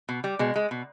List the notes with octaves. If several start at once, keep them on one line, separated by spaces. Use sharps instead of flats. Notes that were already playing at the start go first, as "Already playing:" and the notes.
B2
G3
B2 G#3
G#3
B2